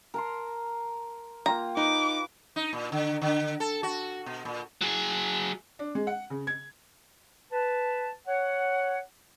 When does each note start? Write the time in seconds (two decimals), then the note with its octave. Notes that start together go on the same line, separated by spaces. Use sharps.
0.14 A#4 A5 C6
1.46 A#3 F4 G5 A#5
1.77 D#4 B4 D6
2.56 D#4
2.73 A#2
2.92 D3
3.22 D3
3.60 A4
3.83 F#4
4.26 B2
4.45 A#2
4.81 F#3 G#4
5.79 D4
5.95 G#3
6.07 F#5
6.30 C#3
6.47 G#6
7.52 B4 A5
8.27 C#5 F#5